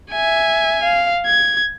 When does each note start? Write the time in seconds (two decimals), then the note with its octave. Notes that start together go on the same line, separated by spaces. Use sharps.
0.11 E5 G#5
0.83 F5
1.26 G#6